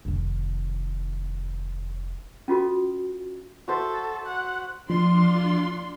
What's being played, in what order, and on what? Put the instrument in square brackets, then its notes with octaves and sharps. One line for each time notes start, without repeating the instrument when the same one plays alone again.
[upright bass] F1 D#3
[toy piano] C#4 F4 F#4 A4
[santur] F#4 C5 E5 [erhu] A4
[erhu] F#5
[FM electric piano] F3 [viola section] D4 F4 C6